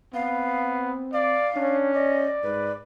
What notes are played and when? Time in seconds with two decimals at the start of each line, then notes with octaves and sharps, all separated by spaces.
0.14 B3 C4 F5
1.13 D5 F5
1.56 C#4 D4
1.94 D5 D#5
2.43 G#2 B4